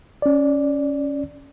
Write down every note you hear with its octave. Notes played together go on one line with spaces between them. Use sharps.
C#4 D5